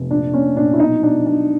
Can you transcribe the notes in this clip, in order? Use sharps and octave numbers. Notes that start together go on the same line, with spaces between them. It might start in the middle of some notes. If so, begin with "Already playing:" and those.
Already playing: F1
A#1 D4
A#2 C#4
A#1 D4
E4
B1 D#4
B2 D4
B1 D4